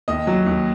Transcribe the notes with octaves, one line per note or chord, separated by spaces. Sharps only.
D#2 D#5
F#3
D#2